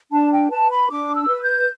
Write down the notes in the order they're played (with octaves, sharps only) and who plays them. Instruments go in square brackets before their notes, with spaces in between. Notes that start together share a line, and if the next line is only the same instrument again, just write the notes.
[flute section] D4 A5
G5
B4 A5
B5
D4 D6
E6
B4
G6